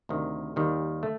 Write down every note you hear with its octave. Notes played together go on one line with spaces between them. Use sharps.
D2 C3 D#3
D#2 D#3 G3
A3